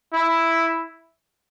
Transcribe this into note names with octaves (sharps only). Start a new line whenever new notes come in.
E4